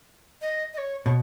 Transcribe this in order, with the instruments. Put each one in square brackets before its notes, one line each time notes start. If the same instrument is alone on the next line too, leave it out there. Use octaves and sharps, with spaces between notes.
[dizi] D#5
D#5
C#5
[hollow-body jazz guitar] B2 [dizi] C#5